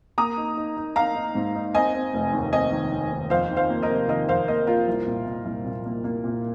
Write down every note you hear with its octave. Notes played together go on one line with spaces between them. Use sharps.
A#3 A#5 D#6
D#4
D#4
D#4
D#4 F5 A#5
D#4
G#2
D#4
C4 D#5 G#5
C4
F1
D#2
C4 D#5 G#5
D#3
D#3
D#2
F2 C5 F5
D#3
C5 F5
A#3
A#4 D#5
C3
D#3 A#4 D#5
F2 C5 F5
A#3 A#4 D#5
A#3 F4 A#4
C2
A#2
A#2
C2
A#2
A#3
A#3
A#2